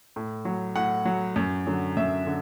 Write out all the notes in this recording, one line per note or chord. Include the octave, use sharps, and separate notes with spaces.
A2
F#3
A2 F#5
F#3
F#2
D3 F#3
F#2 E5
D3